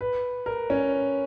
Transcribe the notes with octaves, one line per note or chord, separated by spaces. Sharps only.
B4
A#4
C#4